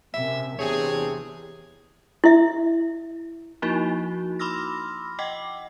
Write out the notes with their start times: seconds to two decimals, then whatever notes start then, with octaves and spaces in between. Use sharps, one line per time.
0.14 F#2 C3 E5
0.59 E2 C3 C4 D4 G#4 C#5
2.24 E4 E5
3.62 F3 A#3 D#4 E4 F#4
4.39 B5 C6 D6 E6 F6 A#6
5.19 D#5 F#5 G5 D6